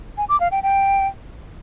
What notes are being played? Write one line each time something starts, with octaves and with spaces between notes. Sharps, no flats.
G#5
D6
F5
G5
G5